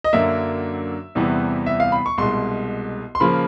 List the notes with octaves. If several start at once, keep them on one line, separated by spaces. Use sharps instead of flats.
D#5
F#2 D3 F#3 A#3 D4 E5
E2 C3 E3 G3 B3
E5
F5
B5
C#6
C2 B2 G#3 C6
C6
C#3 F3 A#3 B5